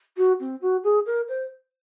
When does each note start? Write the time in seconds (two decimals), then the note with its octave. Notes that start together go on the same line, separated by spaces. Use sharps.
0.17 F#4
0.40 C4
0.62 F#4
0.84 G#4
1.06 A#4
1.28 C5